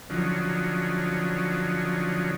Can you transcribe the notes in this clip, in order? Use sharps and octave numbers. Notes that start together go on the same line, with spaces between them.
D3 F3 F#3 C#4 D#4